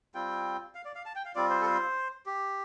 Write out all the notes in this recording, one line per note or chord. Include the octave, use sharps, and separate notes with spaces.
G3 C4 F4 G5
F5
D5
F5
A5
G5
F5
G3 C4 F4 D5
C5
A4
C5
G4